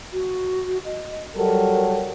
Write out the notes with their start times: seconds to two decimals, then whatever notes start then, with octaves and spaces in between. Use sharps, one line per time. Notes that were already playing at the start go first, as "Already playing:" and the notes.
0.12 F#4
0.84 D#5
1.36 F#3 G3 A4 A#4